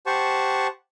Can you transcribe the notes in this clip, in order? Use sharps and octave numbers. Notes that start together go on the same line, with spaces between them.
G4 C5 F#5 A5 C#6